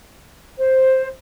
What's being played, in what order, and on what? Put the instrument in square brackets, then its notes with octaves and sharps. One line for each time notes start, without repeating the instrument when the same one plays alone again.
[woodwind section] C5